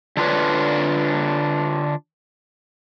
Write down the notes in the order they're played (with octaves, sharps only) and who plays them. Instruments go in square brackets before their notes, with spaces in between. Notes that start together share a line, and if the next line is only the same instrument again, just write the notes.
[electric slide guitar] D3 D4 F4 G4 B4 C#5